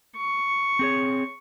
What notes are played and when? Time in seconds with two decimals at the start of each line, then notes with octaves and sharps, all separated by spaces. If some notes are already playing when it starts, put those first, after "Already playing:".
0.17 C#6
0.79 C4 G#4 C#5